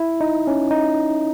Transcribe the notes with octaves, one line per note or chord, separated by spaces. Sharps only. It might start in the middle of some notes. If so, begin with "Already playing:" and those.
Already playing: E4
D#4
C#4
D#4